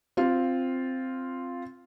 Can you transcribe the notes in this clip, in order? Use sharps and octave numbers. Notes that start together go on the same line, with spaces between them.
C4 F4